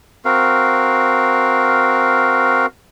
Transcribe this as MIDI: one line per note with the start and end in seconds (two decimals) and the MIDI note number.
0.25 2.66 60
0.25 2.66 66
0.25 2.66 70
0.25 2.66 77